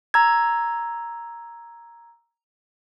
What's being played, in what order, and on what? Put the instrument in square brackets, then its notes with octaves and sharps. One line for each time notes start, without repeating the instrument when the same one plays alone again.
[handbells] A#5 E6 G#6